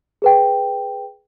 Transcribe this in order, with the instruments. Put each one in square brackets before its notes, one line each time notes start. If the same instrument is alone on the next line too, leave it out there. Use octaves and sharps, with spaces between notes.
[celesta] G#4 B4 G5